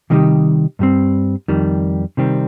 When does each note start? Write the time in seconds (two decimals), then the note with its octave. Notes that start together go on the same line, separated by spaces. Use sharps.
0.10 C3 D#3 G3 D#4 G4
0.79 G2 G3 C4
1.48 F2 D#3 G3
2.17 C3 D#3 G3 C4